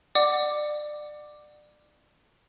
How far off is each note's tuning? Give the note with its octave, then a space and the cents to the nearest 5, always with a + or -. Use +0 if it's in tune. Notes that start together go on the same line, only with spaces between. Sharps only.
D5 +25 F#5 +0 D6 +5